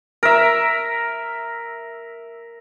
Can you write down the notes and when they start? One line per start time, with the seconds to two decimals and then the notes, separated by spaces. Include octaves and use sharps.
0.23 A#4 E5